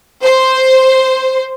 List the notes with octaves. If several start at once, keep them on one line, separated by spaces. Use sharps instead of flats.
C5